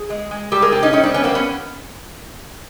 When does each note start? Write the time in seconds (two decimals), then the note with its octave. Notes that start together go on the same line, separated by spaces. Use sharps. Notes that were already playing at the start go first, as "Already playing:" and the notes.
Already playing: G#4
0.10 G#3
0.31 G#3
0.52 G3 G4 A4
0.62 G#4 A#4
0.72 C3 G4 A4
0.83 C#4 D#4
0.93 G3 C#4 D#4
1.03 C4 D4
1.14 G3 B3 C#4
1.24 A#3 C4
1.35 B3 C#4